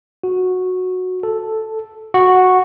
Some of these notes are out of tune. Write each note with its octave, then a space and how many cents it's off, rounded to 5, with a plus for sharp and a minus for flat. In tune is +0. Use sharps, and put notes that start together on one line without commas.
F#4 -10
A4 +0
F#4 -5